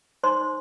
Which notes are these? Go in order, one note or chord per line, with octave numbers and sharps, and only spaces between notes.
D#4 C5 C6